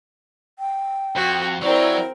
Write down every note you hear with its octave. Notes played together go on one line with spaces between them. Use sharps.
G5
F2 F#4
F#3 C4 E4 A#4 D5